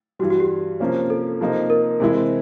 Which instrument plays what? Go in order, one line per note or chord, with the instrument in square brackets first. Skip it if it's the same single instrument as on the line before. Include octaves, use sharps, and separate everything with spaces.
[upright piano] G2 E3 G3 [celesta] F#4
[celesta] F#4
G4
[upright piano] C3 F3 A#3 C#4
[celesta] A4
[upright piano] C3 F3 A#3 D#4
[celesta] A#4
[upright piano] C3 E3 G#3 C4 E4